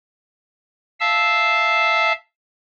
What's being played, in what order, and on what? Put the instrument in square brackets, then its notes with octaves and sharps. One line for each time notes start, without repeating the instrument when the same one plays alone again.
[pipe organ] E5 F5 A5 E6